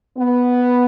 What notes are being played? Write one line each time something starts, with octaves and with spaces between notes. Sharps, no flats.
B3